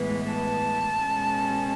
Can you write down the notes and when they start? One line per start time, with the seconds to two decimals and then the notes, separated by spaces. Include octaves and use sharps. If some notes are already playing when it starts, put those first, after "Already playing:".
Already playing: A2 E3 G#3 B3
0.29 A5
1.01 B2 G#3 C#4